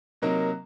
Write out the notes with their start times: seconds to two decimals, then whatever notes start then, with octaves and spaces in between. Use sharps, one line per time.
0.22 C3 F#3 A#3 D#4 A#4